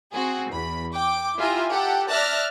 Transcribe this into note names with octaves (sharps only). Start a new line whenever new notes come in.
C4 F#4 G#4
E2 B5
G5 D6
E4 F4 G4 E5 G#5 A#5
G4 A4 F#5 G5
D5 E5 A5 F6 F#6 A#6